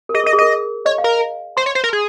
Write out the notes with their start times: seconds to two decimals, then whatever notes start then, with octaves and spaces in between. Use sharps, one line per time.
0.09 A#4
0.14 G#4 D#5
0.24 A#4
0.26 D#5
0.33 G#4
0.38 A#4 D#5
0.85 C#5 D#5
0.98 F5
1.04 A#4
1.57 C5 C6
1.66 C#5
1.75 C5
1.84 A#4
1.93 G#4